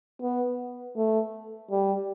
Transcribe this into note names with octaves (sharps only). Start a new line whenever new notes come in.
B3
A3
G3